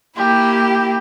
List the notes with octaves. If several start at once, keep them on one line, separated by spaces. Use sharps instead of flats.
A#3 E4 G4